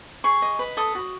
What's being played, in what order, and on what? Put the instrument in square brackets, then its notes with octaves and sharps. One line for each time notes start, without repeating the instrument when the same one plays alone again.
[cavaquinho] G#4 C#6
D#5
B4
A4 D#6
F#4